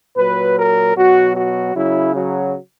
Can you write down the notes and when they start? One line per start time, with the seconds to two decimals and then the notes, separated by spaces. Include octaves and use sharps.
0.17 A#2 F#3 B4
0.57 A#4
0.96 B2 F#3 F#4
1.36 F#4
1.76 C#3 F#3 E4
2.15 F#3